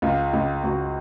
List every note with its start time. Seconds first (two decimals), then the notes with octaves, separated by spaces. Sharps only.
0.02 C#2 F4
0.33 C#2 F4
0.64 C#2 F#4